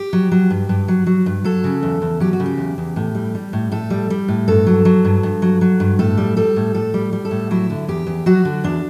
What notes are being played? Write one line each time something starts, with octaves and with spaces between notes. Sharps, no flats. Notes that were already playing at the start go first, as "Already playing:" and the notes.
Already playing: G4
F#3
F#3
G2
G2
F#3
F#3
G2
F#3 A4
C#3
E2
E2
F#3 G4
F#4
C#3
G4
E2
E2
A2
G3
G3
A2
A2 A4
G3
G3
A2
G2 A4
F#3
F#3
G2
G2
F#3
F#3
G2
A2 A4
G3
G3 A4
A2
A2 A4
G3
G3
A4
A2
F#3 E4
D3
E2 G4
E2
F#3 F#4
D3
E2 D4